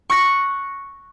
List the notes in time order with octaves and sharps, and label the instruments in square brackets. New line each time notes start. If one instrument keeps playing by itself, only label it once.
[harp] C#6 F#6 A#6 C#7